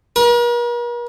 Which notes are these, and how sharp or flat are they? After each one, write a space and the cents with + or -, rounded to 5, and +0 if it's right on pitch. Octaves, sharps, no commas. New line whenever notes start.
A#4 +45